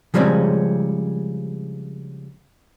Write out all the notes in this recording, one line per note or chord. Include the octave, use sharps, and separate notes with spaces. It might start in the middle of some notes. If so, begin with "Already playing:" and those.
C#3 F3 G3 G#3 C4 C#4